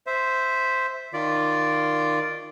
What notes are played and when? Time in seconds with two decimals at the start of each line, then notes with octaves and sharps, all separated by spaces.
0.07 C5 E5
1.14 D#3 F4 D5